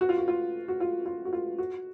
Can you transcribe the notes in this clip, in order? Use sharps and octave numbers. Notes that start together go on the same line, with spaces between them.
F#4
F4
F#4
F4
F#4
F4
F4
F#4
F4
F#4